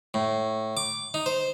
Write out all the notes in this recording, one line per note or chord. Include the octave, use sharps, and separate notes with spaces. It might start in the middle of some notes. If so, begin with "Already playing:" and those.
A2
D6
D#4
C5